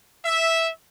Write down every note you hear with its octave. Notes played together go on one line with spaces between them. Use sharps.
E5